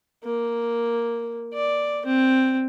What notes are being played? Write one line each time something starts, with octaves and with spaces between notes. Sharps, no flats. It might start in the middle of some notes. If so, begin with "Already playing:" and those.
A#3
D5
C4